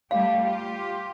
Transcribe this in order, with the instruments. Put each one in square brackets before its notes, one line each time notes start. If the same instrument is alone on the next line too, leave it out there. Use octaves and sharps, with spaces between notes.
[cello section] G3 A3 G4 [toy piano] F5
[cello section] F4 G4